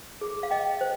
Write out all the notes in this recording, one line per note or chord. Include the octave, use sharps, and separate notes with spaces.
G#4
F5
D#5 G5
C5